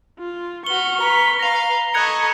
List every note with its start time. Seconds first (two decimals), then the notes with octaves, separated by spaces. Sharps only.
0.19 F4
0.66 F#4 B4 C#6 F6 G7
1.00 B4 A#5 B6
1.39 B4 F5 A#6 F7
1.94 A4 D#5 B5 C#6 F#6 G#6 C#7